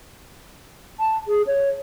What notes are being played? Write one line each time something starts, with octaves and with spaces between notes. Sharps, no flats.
A5
G#4
C#5